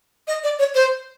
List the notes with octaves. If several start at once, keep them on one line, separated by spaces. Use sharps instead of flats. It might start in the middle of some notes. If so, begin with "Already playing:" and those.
D#5
D5
C#5
C5